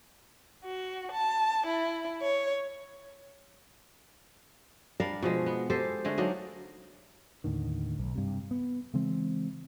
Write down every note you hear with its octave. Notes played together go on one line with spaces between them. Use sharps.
F#4
A5
E4
C#5
G3 D4 A#4 F5
B2 F3 G#3
B3
G#3 G4 A4 C5
D3 G#3 A3
F#3 A#3 D4 D#4
D#2 A2 D3 D#3
B1
G2 C3
B3
C#3 E3 G#3 C4